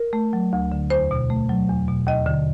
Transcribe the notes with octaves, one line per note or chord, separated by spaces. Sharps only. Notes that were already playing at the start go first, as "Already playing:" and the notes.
Already playing: A#4
A3
F#3
D2
D3
E2 C5
B2
A3
F#3
E2
B2
D#2 D#5
D3